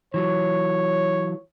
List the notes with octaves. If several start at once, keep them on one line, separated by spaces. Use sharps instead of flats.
E3 F#3 C#5